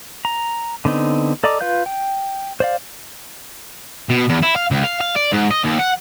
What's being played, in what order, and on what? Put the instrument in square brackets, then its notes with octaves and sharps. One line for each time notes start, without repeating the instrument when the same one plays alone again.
[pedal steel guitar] A#5
D3 B3 C4 D#4
A4 D5 D#5 A#5 D6
F4 B4 F5 G6
G5
C5 D5 F5
[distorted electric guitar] B2
E2
E4
F5
C#2
F5
F5
D5
G#2
D#5
D#2
F#5